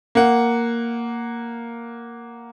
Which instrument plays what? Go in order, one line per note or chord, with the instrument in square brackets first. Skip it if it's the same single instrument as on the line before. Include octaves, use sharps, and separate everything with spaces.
[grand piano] A#3 F#5